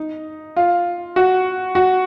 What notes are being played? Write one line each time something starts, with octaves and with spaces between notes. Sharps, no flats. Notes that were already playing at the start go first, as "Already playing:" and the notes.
Already playing: D#4
F4
F#4
F#4